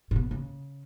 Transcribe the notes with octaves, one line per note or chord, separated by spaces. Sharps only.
A#2
B2
C#3